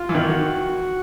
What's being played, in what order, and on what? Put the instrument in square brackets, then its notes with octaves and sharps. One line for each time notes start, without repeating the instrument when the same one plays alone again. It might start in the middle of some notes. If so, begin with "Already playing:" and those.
Already playing: [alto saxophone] F4
[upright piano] E3
D#3
[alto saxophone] F#4